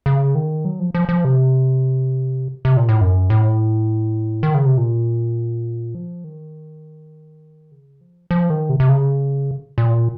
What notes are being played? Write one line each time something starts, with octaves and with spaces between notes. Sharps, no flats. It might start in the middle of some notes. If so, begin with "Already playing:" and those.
C#3
D#3
F#3
F3
F3
F3
C3
C3
A#2
A2
F#2
A2
D#3
C#3
C3
A#2
F3
D#3
C#3
F3
F3
D#3
C3
C3
C#3
A#2